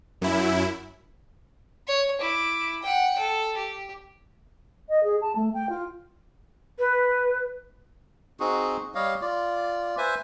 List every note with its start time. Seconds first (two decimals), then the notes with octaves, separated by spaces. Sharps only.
0.22 F#2 E4
1.88 C#5
2.20 E4 D6
2.83 F#5 G5
3.19 A4
3.58 G4
4.88 D#5
5.03 G#4
5.21 A5
5.35 A3
5.53 G5
5.69 F4
6.79 B4
8.40 C4 D#4 F#4 G#4
8.95 G3 C#5 D#5 F5
9.22 F4 D5
9.98 B4 C5 E5 G#5